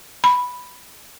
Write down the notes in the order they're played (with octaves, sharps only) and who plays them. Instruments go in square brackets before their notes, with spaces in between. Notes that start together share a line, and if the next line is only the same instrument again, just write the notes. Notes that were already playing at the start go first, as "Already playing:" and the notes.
[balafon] B5